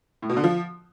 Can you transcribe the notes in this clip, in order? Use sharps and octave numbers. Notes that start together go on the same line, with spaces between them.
A2
B2
D3
F3